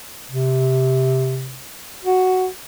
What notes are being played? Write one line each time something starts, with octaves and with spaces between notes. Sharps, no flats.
C3
F#4